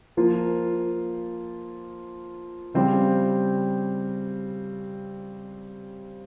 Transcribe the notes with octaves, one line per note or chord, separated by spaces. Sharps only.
F3 A#3 F4
C#3 G3 C4 G4